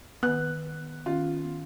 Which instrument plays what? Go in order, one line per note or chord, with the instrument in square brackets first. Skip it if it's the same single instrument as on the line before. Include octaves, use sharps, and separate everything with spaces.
[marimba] D#3 B4 [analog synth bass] B3 [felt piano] F#6
[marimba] D#3 C#4 [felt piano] F4